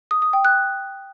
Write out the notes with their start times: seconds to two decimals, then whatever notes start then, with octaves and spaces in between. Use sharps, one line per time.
0.11 D#6
0.22 D#6
0.33 G5
0.45 F#6